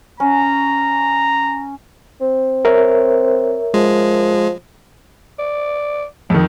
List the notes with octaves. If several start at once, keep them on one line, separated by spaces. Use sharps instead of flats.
C#4 A#5
C4
A#4 C#5 E5
F3 G#3
D5
F2 D#3 G#3